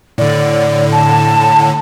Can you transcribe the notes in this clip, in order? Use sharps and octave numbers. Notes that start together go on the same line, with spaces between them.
A2 D3 D5
A5